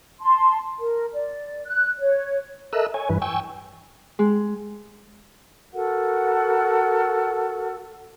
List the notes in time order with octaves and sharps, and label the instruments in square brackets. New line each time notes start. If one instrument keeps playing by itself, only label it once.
[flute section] A5 C6
A#4
D5
F#6
C#5
[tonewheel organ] A4 A#4 D#5 E5 E6 F#6
C#5 G#5
G2 E3 B4
G5 G#5 C#6 E6
[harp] G#3
[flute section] F#4 A4 A#4 F#5